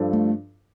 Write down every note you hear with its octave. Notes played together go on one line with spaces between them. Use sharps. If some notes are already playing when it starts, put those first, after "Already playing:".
Already playing: G2 F3 D4 A4 C5
A3